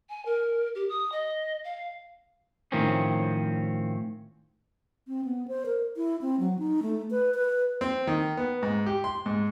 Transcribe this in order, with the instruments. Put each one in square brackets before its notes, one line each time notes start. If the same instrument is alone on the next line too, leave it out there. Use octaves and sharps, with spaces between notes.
[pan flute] G#5
A#4
G4
D#6
D#5
F5
[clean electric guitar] A2 D#3 F3 C4 C#4
[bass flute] C4
B3
C5
A#4
E4
C4
F#3
D#4
A3
B4
B4
[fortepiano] C4
D#3
B3
G#2
G4
C6
G#2